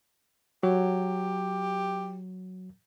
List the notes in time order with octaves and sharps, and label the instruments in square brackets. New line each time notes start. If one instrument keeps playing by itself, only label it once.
[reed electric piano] F#3 [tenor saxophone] G4